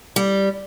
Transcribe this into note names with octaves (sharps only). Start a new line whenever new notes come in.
G3